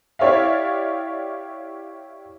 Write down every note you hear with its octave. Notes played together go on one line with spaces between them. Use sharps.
E4 G4 C#5 D5 E5 F5